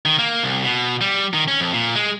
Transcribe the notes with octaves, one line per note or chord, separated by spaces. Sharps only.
D#3
A#3
C2
B2
G3
D#3
C#4
F2
A#2
G#3